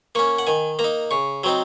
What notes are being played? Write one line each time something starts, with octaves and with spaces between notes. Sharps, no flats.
A#3 C#4 C#6
F#5
D#3 G#5
A#3 A#5
D#4
C#3 C#6
F#3 C4 D#4